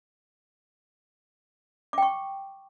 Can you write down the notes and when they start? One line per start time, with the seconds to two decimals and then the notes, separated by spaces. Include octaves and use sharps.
1.93 D6
1.98 G5
2.02 C#6